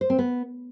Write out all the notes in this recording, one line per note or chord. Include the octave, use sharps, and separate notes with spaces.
C5
C4
B3